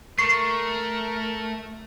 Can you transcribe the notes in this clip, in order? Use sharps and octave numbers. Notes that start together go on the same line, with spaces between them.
A3 A#4 C#6 C7